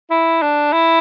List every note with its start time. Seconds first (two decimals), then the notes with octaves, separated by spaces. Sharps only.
0.11 E4
0.42 D4
0.73 E4